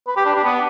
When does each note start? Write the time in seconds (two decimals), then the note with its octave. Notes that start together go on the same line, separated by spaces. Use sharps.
0.08 B4
0.17 G4
0.26 D4
0.36 D4
0.44 B3